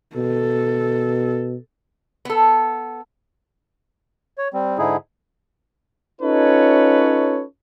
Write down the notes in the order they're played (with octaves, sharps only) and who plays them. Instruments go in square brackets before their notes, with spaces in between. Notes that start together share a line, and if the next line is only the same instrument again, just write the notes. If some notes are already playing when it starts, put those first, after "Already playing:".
[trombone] B2 [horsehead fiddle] A4
[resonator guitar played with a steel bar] B3 A4
[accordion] C#5
G3 C4
G#2 D3 D#4 E4 G#4
[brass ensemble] C#4 D#4 F4 A4 B4 C#5